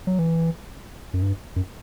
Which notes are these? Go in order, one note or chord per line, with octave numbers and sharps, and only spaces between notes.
F#3
E3
F#2
G2
F#2